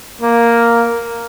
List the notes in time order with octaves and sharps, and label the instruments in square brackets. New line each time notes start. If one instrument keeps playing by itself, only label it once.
[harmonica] A#3